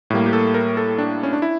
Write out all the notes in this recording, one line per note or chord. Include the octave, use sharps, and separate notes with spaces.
A2 G3 A#3
G4
A4
A#4
A4
D4
C#4
D4
E4